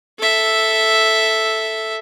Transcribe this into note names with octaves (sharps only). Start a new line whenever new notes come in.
A4 E5